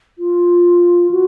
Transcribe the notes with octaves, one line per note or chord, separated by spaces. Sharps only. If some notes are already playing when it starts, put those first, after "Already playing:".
F4
F#4